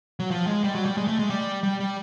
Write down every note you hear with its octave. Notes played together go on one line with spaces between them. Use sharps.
F#3
F3
G#3
G3
F#3
G3
G#3
A3
G#3
G3
G3
G3